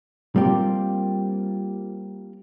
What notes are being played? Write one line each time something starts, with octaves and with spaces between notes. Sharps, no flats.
G3 A#3 C4 F4 G4